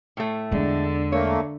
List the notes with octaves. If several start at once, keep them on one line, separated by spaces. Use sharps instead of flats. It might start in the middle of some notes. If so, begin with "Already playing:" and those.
A2 A3
E2 D3 G#3
A3 A#3 C#5